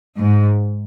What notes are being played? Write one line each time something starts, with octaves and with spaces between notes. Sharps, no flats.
G#2